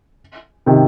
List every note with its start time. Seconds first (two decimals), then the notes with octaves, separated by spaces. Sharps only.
0.66 C3 D#3